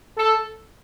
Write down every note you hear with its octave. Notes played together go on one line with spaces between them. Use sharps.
A4